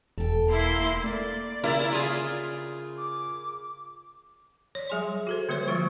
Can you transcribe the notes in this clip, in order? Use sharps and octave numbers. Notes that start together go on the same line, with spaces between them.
E1 A4 G5
A#3 E4 C6
A#3 D5
C#3 A#3 E4 A#4
F4 G#4
D6
C#5 D5
F#3 G3 G#4 G#5 C6
F#4 A4 C5
D3 G3 A#3 C5 C#5
F3 G3 G#3 F4 C5 C#6